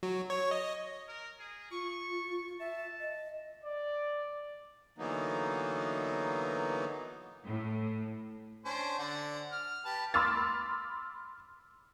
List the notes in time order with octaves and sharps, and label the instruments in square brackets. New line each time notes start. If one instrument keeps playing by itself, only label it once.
[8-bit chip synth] F#3
C#5
D#5
[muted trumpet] A#4
G#4
[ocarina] F4 [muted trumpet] C#6
[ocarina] E5 [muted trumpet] A5
[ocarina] D#5
[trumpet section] D5
[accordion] D3 E3 F#3 A#3 B3 D#4
[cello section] A2
[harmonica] C#4 D4 C5
D3 D5 F#5
F6
G4 B4 A5
[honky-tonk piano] B5 C6 D6 E6 F6 A6